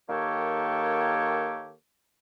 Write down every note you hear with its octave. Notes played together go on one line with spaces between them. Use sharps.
D#3 A#3 G4 A4 C#5